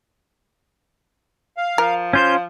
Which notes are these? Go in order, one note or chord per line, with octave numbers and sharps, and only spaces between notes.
F5
F3 A#4
C#4 F4 C5 G6